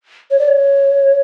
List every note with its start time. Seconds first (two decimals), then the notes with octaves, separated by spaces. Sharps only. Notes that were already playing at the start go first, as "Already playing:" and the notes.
0.31 C#5
0.39 D5
0.48 C#5